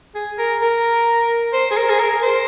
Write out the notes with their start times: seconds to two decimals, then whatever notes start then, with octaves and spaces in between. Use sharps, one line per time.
0.15 G#4
0.38 A#4
0.62 A#4
1.53 C5
1.71 G#4
1.77 A#4
1.90 G#4
2.00 A#4
2.23 C5